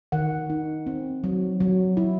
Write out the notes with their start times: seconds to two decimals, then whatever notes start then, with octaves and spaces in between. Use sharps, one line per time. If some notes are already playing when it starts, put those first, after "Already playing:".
0.12 D#3 F#5
0.50 D#4
0.87 C4
1.24 F#3
1.60 F#3
1.97 E4